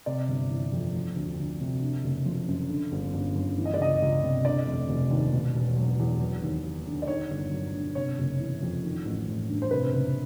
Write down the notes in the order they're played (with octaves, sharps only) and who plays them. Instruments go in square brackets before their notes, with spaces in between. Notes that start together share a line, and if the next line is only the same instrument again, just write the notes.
[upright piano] C3 D5
G1
E3
F2
F3
D2
D2
C3
D3
F#1
F3
F#2
D3
G1
G1
F#2
E3
D#5
D5
C#2 D#5
C#2
C3
D3 D5
F1
F1
D#2
B2
E1
F#3
E2
F#3
D#2
D#2
D3
D5
D#3 C#5
G1
F#3
G2
C3 C#5
F#1
E3
F2
D#3
A1
A1
G2
C5
C3 B4
F#1